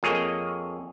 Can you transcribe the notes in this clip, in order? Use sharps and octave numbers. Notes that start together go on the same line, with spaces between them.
F2 A#3 G#4 C#5 D#5